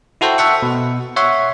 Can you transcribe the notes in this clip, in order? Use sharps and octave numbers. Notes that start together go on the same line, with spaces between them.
E4 F#4 A4 C5 G5
A4 E5 F#5 C#6
B2
C#5 E5 F#5 C6 C#6